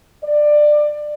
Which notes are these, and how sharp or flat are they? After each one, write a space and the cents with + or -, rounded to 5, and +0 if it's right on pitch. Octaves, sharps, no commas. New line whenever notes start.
D5 +20